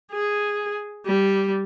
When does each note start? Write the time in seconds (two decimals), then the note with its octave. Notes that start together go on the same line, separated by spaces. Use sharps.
0.12 G#4
1.06 G3